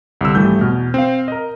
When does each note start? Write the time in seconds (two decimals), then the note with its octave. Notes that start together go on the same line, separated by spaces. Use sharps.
0.21 C2 G2 D3 E6
0.35 G#1 E3 G3 A3 G6
0.61 E2 B2 F6
0.94 C4 F5
1.28 A#4 D#5